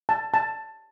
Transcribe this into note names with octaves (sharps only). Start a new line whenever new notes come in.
A5
A5